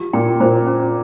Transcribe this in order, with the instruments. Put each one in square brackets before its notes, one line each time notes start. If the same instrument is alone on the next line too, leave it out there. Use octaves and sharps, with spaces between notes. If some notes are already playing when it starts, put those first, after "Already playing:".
Already playing: [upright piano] F3 [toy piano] G4
[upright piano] A#2 [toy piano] G5
[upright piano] A#2 [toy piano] C5
[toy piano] C#4